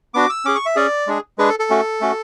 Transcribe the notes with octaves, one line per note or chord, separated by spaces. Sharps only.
B3 D4 F#4 D6
E6
C#4 G#4 D6
C#6
E5
C#4 G#4 D5
G#3 D4 G#4
G#3 D4 G#4 B4
A4
A4
A3 C#4 F#4
A3 C#4 F#4